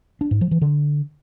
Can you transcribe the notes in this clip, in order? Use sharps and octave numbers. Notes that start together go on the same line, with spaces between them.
D4
G#2
F3
E3
D3